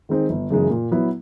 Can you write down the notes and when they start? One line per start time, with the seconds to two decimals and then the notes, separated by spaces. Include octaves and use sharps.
0.09 D#3 G#3 C4 D#4
0.29 G1
0.50 F#2 C#3 E3 G#3
0.70 A#2
0.91 F#3 B3 E4